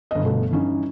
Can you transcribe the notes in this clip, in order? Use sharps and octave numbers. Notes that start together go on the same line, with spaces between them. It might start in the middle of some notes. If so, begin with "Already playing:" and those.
G1 D#5
G1 B2 A3
G2 E3 C#4 D#4